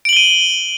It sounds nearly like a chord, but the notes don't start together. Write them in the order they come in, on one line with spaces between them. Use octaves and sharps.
D7 F#7 G7 D#7